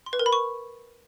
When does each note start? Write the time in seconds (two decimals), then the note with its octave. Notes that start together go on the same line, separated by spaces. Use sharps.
0.06 C6
0.13 B4
0.19 A#4
0.26 B5
0.33 C#6